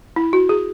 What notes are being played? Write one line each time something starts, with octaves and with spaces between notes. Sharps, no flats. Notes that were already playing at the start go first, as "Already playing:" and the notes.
E4
F#4
G#4